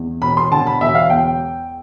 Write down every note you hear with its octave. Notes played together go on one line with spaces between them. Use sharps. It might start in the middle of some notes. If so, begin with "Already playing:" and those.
Already playing: E2
E1 B5
C6
D3 A5
B5
E1 E5
F5
E2 G5